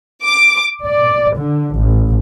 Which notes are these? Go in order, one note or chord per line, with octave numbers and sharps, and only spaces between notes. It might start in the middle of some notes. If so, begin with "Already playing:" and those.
D6
D5
D3
A1